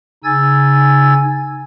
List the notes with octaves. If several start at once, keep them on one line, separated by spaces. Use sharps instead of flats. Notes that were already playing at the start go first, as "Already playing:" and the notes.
C#3 D#4 G#5 E6 G#6 A6